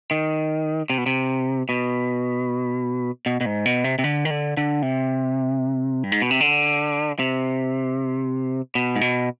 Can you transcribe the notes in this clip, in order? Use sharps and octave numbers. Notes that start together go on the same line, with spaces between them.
D#3
C3
B2
C3
B2
B2
B2
G#2
B2
C3
C3
D3
D#3
D3
D3
C3
G2
G#2
B2
C3
D3
C3
B2
G#2
B2